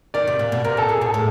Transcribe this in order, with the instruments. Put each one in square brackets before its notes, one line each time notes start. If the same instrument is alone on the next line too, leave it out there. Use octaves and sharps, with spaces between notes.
[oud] D#3 [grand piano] D5
[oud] C3
A#2
B2
[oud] C3 [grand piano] A#4
[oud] B2 [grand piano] A4
[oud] A#2 [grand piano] G#4
[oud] B2 [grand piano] A4
[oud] A2